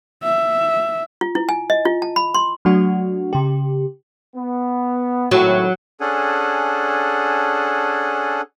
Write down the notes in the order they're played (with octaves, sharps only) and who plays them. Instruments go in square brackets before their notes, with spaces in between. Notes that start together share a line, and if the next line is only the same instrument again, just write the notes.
[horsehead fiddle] E5
[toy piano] F4
E4
G#5
D#5
F4
A5
B5
C6
[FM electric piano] F#3 A3 D4 F#4
C#3 G4
[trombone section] B3
[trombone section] G#1 A2 [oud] F#3
[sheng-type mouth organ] C#4 D4 G#4 A4 F#5 G#5